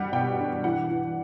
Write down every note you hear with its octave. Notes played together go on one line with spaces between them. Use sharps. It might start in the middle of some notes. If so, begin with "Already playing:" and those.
Already playing: G3 D4 F#5
B2 G5
D4
E3 F#5
E3